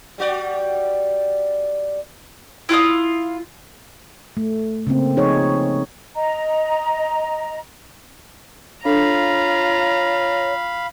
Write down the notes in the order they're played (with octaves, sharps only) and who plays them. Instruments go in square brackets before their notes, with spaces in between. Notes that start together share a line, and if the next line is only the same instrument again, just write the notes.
[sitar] G3 F#4 D5
[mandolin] E4 F4 F5 D#6
[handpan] A3
C#3 A#3 C4
F3 D#4 G#4 C#5
[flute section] D#5 A#5
[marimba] D4 A4 [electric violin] F4 A#5 [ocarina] C#5 [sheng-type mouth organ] F5 B5